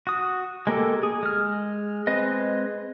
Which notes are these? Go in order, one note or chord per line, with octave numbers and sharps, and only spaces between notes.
F#4 D#6
G#3 A#3 G4 A4
G#4
G#3 F6
G#3 C4 B4 D#5